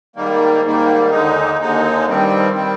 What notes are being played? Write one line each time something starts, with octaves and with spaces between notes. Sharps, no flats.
G#2 D#3 G3 A#3
G#2 D#3 G3 A#3
D#2 D3 G#3 D#4
D#2 D3 G#3 D#4
G2 D#3 G3 C4
D#3 G3 C4